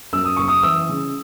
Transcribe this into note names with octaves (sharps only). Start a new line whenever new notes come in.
F#2 E6
D#6
F#1 C#6
D#6
E3 E6
C#3